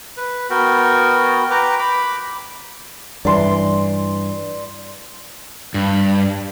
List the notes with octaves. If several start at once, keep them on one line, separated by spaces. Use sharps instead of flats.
B4
B3 F#4 A#4 G5
B4 G5 A#5 D6
B5 D6
G2 E3 D5 C6
G2